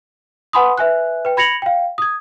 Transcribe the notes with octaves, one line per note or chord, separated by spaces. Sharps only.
B4 F#5 G#5 B5 C6 D#6
B4 E5 G#5 F#6
B4 G5
B5 G#6 A#6 C#7 F7 F#7
F5 G5
D#6 G#6